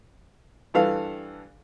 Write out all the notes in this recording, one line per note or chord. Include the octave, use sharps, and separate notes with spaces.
G2 E3 A4 F5